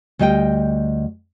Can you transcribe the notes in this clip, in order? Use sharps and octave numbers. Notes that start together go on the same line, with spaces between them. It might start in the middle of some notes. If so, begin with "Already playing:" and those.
D2 G3 D#5 E5 G5